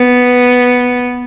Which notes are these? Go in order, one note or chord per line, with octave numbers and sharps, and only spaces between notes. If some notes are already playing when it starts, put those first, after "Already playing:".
Already playing: B3